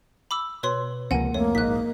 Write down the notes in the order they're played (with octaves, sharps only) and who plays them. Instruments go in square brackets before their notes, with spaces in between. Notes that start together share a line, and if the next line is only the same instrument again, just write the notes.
[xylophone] B5 D6 E6
[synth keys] B2 [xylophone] B4 C#5 C6
[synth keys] C#2 C3 F3 [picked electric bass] A#3 C4 [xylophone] F#5 G#5
[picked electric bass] F2 [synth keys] A3 [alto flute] A#3 [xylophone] C#5
[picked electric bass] A#1 G#2 [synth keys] D#4 D#5 [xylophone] F#6 B6